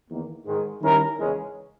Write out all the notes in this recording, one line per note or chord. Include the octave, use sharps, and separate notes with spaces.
E2 D#3 A#3
G#2 D#3 G#3
D#3 G3 C#4 E4 A#4
E2 C#3 G#3 C#4